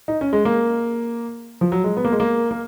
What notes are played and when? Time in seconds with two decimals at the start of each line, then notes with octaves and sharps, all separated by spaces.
0.08 D#4
0.21 C#4
0.33 G#3
0.45 A#3
1.61 F3
1.72 F#3
1.84 G#3
1.97 B3
2.05 A#3
2.12 G#3
2.20 A#3
2.51 A#3